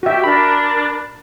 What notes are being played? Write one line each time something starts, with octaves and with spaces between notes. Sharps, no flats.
F#4 G4 E5
D4 A#4 B5